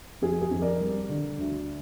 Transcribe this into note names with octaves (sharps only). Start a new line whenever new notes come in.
F2 G#4
G#4
F2
A#4 D5
G3
D3
D2